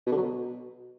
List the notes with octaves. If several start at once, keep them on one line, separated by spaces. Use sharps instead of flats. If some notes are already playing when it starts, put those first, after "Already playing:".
B2
D3
F#3
B2